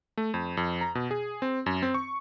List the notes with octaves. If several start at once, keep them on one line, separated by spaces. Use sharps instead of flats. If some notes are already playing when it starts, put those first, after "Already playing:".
A3
F2
F2
A#5
B2
G#4
C4
F#2
C4
C#6